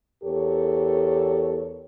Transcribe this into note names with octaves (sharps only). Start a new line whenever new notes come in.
E2 G4 A4 A#4 C#5